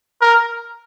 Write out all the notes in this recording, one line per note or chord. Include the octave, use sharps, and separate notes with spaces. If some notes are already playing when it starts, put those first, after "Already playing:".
A#4